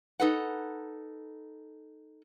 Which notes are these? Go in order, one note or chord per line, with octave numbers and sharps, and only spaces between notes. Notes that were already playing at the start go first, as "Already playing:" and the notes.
D#4 A4 B4 F#5